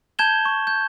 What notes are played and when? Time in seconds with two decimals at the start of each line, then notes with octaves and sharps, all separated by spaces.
0.19 A5 G6 G#6 E7 G7
0.45 C#6
0.67 G6